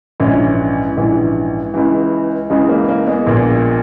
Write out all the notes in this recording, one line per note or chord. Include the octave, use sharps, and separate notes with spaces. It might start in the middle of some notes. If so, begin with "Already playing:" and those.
A#1 G#2 E3 C#4 E4
A#1 G#2 E3
C#2 C#3 E3
C#2 C#3 E3 G#3
A#3
A#3
G#3 B3
A#1 A#2